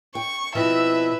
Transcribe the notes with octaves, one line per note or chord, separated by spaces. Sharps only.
G5 C#6
B2 F3 C4 E4 B4 E5